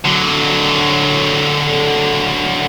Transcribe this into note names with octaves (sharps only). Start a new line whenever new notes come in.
D3 F#3